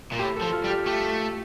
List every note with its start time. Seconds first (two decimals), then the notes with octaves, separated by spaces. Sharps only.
0.12 A#2
0.19 A2 G4
0.36 A4
0.41 F3
0.53 F4
0.64 G3
0.70 G4
0.86 A3 G4